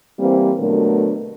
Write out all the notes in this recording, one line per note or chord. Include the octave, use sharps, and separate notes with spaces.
E3 G3 A#3 C4
B2 D3 F#3 A3 A#4